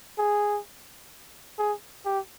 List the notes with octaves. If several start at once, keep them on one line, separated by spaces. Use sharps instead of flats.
G#4
G#4
G4